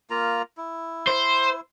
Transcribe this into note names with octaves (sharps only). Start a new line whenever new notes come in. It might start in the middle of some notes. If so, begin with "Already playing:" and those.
A#3 F4 A#5
E4
C5